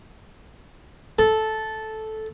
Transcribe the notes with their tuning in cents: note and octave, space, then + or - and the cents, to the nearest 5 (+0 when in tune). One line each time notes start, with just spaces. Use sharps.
A4 -10